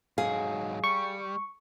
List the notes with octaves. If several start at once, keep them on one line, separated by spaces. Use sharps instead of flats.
G#2 F#3 G#4 F5
G3 C#6